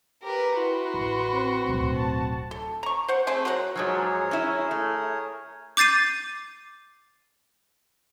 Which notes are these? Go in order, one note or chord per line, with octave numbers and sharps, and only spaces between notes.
G4 A#4 B4
E4 F#4 B4 C6
A1
C4
D1 B1
A5
A4
A#5 C#6
C5 F#5
A3 C4 G#4 C5
F#3 F#4 A#4 F#5
G#2 F3 F#3 G#4 A#4 C#5
C#4 E4
A3
D6 G6 A6 C7 D#7